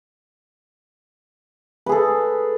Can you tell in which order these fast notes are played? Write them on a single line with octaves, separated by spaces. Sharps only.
B4 G#4 A4